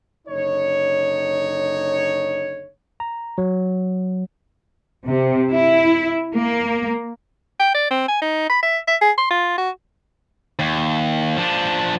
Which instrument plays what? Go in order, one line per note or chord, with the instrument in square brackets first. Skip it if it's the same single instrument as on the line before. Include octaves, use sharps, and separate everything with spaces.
[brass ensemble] F#1 D3 D#4 C#5
[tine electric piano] A#5
F#3
[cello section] C3
E4
A#3
[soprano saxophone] G5
D5
C4
G#5
D#4
B5
E5
E5
G#4
C6
F4
F#4
[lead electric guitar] D#2
F3 D4